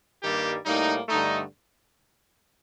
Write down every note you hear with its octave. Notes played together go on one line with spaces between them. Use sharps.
G2 D#3 G3 A#3 G4
A2 G3 A#3 D#4
G2 D3 A3 D#4